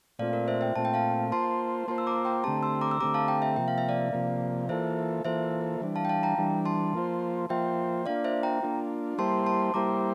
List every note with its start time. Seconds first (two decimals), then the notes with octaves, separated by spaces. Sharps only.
0.19 A#2 A3 C4 F4 D5 F5
0.33 A#4 D5
0.48 C5 E5
0.61 E5 G5
0.76 A#2 A3 C4 F4 A5
0.85 G5
0.94 F5 A5
1.32 A#3 F4 C5 A5 C6
1.88 A#3 F4 C5 A5 C6
1.98 E6
2.07 A#5 D6
2.25 G5 A#5
2.44 D3 A3 C4 G4 A5 C6
2.63 C6 E6
2.81 A#5 D6
2.91 E6
3.00 D3 A3 C4 G4 A#5 D6
3.14 F5 A5
3.28 G5 A#5
3.42 E5 G5
3.56 C3 F3 A#3 G5
3.68 F5
3.78 E5
3.89 D5 F5
4.13 C3 F3 A#3
4.69 E3 A#3 F4 A4 C5 E5
5.25 E3 A#3 F4 A4 C5 E5
5.81 E3 G3 D4
5.96 F5 A5
6.05 G5
6.09 F5 A5
6.23 G5 A#5
6.38 E3 G3 D4
6.65 A5 C6
6.93 F3 A#3 F4 C5
7.49 F3 A#3 F4 C5 E5 G5
8.06 A#3 D4 F4 D5 F5
8.24 C5 E5
8.43 G5 A#5
8.62 A#3 D4 F4
9.18 G3 A#3 E4 G4 C5 A5 C6
9.46 A5 C6
9.74 G3 A#3 E4 G4 C5 A#5 D6